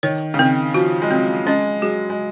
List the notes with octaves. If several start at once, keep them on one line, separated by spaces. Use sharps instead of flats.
D#3 C#5
C#3
D#3 C4
F3 F#4
G#3
F#3 C4
G#3 C#4
F#3 G#4
G#3